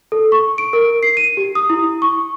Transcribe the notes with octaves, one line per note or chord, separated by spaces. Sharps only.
A4
C#6
D7
A#4
C7
D#7
G4
D#6
E4
C#6